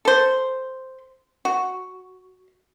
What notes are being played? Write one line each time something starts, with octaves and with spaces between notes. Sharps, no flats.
A4 C5
F#4